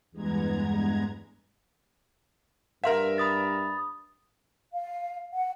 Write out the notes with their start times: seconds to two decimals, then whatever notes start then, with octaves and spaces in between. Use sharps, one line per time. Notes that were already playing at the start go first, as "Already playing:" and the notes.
0.11 E2 G2 G#3 B3 A#5 G#6
2.84 G2 A#4 E5 F5 C6
3.18 B5 D#6 A6
4.74 F5
5.33 F#5